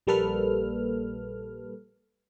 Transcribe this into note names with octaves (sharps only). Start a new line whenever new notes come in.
A#1 G3 A#3 A4 B4 F6